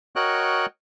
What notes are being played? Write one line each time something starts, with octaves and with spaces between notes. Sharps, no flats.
F#4 A#4 C#5 D#5 G5 F#6